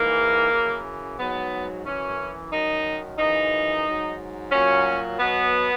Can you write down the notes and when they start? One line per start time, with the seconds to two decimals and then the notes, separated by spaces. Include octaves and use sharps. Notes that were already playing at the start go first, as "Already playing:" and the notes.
Already playing: G#2 E3 A#3
0.51 F#2 C#3 E3
1.18 G#2 F#3 B3
1.85 F#2 E3 C#4
2.52 F#2 D#3 F#3 D#4
3.18 F#2 C#3 E3 D#4
3.86 G#2 F#3
4.52 A#2 F#3 C#4
5.19 B2 F#3 B3